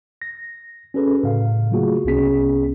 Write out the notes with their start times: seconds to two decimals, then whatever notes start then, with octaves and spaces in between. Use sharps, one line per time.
0.22 A#6
0.94 C#4 F#4 G#4 A4 B4
1.23 A2 C#3 F5
1.71 F#3 A3 A#3 F4 F#4 G#4
2.05 C2 C3 B3 C#4 G#4 B6